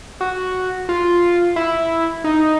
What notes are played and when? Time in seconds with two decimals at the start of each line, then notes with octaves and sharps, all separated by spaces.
0.21 F#4
0.89 F4
1.56 E4
2.24 D#4